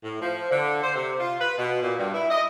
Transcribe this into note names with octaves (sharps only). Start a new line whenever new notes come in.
A2
F3
D3
C5
C3
F4
B4
B2
A#2
G2
E4
D#5